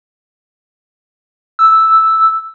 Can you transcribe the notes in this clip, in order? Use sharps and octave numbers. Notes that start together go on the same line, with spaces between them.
E6